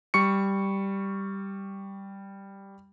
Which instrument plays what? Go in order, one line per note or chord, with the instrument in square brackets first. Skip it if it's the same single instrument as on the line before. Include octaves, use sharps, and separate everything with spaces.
[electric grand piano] G3 C#6 C#7